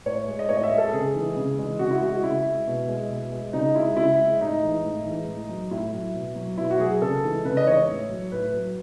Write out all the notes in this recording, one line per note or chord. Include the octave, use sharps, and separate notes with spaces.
A2 C#5
G#3
D#5
A2 C#5
D#5
E5
G#3
A4
C#3 G#4
E3 G#3
C#3
E3 G#3
C#3 F#4
E4
G#3 F#4
F#4
C#3 E4
G#3
B2
G#3
B2
G#3
C#3 D#4
G#3 E4
C#3 E4
G#3
A2 D#4
E3 G#3
A2
E3 G#3
A2
F#3
A2 E4
F#3
B2
F#3
B2 E4
F#4
F#3 G#4
C#3 A4
E3 G#3
C#3 B4
D#5
E3 G#3 C#5
A2
F#3
A2 B4
F#3